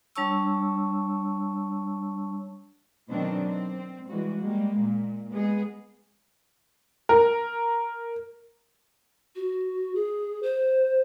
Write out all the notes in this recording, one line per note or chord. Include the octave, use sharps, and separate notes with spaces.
G3 D4 C#5 A5 C#6 E6
B2 D#3 F#3 C4 D4
C4
E3 G3 G#3 F#4
G3 G#3 A#3
A#2
G#3 B3 G#4
A#4
F#4
G#4
C5